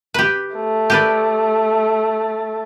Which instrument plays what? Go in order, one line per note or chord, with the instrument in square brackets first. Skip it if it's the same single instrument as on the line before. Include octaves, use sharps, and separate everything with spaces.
[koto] G4 B4
[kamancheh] A3
[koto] G4 B4 D5